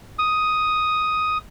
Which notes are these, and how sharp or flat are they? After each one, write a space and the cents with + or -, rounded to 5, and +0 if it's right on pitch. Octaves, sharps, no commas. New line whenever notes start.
D#6 +5